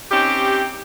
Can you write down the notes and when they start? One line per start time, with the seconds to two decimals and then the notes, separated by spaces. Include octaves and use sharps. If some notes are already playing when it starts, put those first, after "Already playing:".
0.12 C4 C#4 D#4 G4